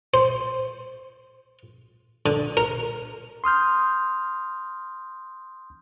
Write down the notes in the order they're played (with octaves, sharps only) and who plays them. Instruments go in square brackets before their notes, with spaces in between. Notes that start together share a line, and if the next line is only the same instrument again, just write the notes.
[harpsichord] C5
D3
A#4
[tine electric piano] C6 D#6 F6 G6